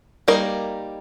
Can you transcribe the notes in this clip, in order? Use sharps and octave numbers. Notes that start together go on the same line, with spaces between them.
G3 A#3 D#4 A#4